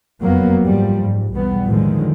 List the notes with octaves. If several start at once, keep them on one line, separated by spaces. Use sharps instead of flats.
F#1 F2 F#3 A#3 B3
G#2 F3 G3
G#2
B1 E2 G3 B3
A2 D3 D#3 F3 G#3